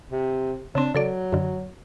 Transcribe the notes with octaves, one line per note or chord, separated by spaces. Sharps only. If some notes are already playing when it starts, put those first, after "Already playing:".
C3
C#3 C4 D4
C#3 F#3 A4 D5
F#2 D3